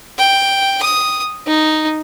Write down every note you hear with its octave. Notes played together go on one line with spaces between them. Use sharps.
G5
D#6
D#4